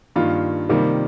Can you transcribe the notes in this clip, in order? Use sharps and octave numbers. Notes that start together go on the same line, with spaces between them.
G2 D#3 A#3 F4
C3 D#3 G3 A#3